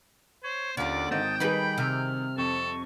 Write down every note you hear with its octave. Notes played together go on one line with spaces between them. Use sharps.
C5 C#5
D#2 D3 C#4 F4 D5
G#1 D#5 G5 A5 D#6 A6
D#3 G3 D#4 G#4 B4 B5
C3 F6
F2 A4 C#6